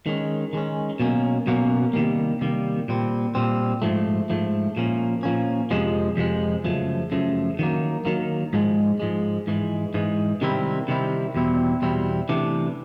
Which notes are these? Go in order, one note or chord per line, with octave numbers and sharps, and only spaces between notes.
D#3 G#3 C#4
D#3 G#3 C#4
B2 F#3 A#3 C#4
B2 F#3 A#3 C#4
C3 D#3 G3 A#3
C3 D#3 G3 A#3
A#2 G3 C4
A#2 G3 C4
G#2 F3 A3
G#2 F3 A3
A#2 F3 A#3 C#4
A#2 F3 A#3 C#4
F2 C3 F3 G#3
F2 C3 F3 G#3
F#2 C#3 F3 A3
F#2 C#3 F3 A3
D#3 F#3 A#3
D#3 F#3 A#3
G#2 F3 G#3
G#2 F3 G#3
G#2 E3 G#3
G#2 E3 G#3
C3 D#3 G3 C4 E4
C3 D#3 G3 C4 E4
E2 B2 G3 C4 E4
E2 B2 G3 C4 E4
C3 E3 A3 D4